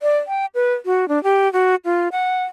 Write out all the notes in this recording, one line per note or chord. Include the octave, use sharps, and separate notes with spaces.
D5
G5
B4
F#4
D4
G4
F#4
F4
F#5